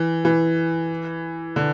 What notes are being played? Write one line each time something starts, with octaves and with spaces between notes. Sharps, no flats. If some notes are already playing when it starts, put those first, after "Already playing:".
Already playing: E3
E3
D3